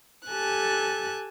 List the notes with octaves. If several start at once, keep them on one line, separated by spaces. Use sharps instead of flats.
G4 A4 G#5 A5 F#6